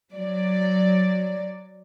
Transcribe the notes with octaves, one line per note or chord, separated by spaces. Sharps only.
F#3 D5